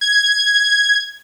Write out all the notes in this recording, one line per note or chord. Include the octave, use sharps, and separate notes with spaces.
G#6